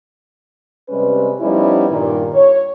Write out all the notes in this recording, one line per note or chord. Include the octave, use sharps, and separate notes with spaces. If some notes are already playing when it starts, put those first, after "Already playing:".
C3 G3 G#3 C#4 B4
F3 G3 B3 C#4 D#4 E4
G2 A#2 D#3
C#5